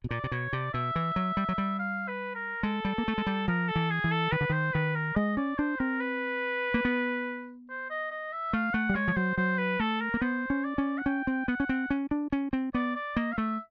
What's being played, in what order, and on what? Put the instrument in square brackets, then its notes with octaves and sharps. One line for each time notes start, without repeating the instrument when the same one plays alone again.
[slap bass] B2
[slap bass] A#2 [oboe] D5
[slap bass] C3
[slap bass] B2 [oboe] C#5
[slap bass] C3 [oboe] D5
[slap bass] B2 [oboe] E5
[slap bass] E3
F#3
G3
F#3
G3
[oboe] F5
B4
A#4
[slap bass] G#3 [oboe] A4
[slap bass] G3
A#3
A3
G#3
G3
[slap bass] F3 [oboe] A#4
[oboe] A4
[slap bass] E3
[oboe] G#4
[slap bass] E3
[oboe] A4
[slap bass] D#3 [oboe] B4
[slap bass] D3
[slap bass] D#3 [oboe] C5
[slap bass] D#3 [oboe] B4
[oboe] A#4
[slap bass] G#3 [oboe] D#5
[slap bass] C#4 [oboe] D5
[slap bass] D4 [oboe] C5
[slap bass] C4 [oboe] A#4
[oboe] B4
[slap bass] A#3
B3
[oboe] C5
D#5
D#5
E5
[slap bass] A3 [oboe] F5
[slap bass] A3 [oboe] F#5
[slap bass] G3
[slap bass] G#3 [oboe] C#5
[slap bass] F3
[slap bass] F#3 [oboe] C5
[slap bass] F#3 [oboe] C5
[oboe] B4
[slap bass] A3 [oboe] A4
[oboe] A#4
[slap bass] A#3
[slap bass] B3 [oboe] C5
[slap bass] C#4
[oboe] D5
[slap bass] C#4
[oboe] F#5
[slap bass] C#4 [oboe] G5
[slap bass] C4
[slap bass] B3 [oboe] F#5
[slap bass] C#4
C4
C#4
D4
C#4
C4
[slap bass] B3 [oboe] D5
[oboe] D5
[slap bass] A#3 [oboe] D#5
[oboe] F5
[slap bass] A3 [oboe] E5